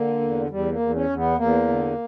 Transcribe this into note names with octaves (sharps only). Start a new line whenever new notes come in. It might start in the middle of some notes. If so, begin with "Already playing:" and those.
Already playing: D3 A#3
E2
E2 G3
A#3
E2
C#4
E2
B3
E2 A#3
D3